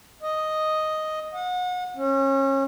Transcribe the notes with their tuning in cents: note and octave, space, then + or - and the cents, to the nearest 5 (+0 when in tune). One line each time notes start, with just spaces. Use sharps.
D#5 +0
F#5 -35
C#4 -30